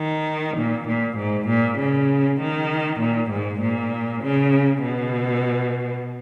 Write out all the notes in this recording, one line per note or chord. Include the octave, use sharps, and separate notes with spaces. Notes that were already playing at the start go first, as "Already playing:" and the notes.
Already playing: D#3
A#2
A#2
G#2
A#2
C#3
D#3
A#2
G#2
A#2
C#3
B2